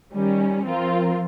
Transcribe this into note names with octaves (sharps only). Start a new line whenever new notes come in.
D#3 G3 C#4
F3 C4 F4 A#4